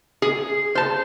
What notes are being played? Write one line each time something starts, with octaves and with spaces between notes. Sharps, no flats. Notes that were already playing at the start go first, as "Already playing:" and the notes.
G#4
C5 A5